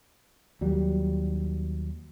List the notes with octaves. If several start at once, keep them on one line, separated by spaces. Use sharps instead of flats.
D#2 F#3 G3